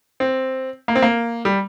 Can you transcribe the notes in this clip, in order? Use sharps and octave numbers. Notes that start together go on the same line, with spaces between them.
C4
A#3
C4
A#3
G3